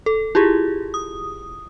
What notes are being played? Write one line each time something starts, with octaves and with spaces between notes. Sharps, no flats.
A4
E4 F4 G4 G#4
D#6